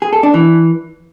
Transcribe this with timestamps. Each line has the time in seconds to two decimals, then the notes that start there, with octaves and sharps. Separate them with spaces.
0.02 G#4
0.13 A4
0.23 D4
0.34 E3